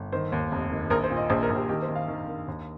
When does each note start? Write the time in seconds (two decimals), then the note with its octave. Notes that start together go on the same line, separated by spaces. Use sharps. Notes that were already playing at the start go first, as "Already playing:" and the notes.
Already playing: G1
0.12 D#3 C5
0.32 D#2
0.52 F1
0.71 D#3
0.90 A#1 A#4
1.04 C5
1.10 A#2
1.17 D#5
1.30 A#1 C5
1.43 A#4
1.50 A#1
1.56 G4
1.69 D#3 G4
1.82 C5
1.89 D#3
1.95 F5
2.08 D#3 A#4
2.28 D#3
2.48 D#2